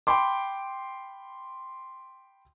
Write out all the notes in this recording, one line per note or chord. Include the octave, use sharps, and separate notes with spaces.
G5 B5 C6 D6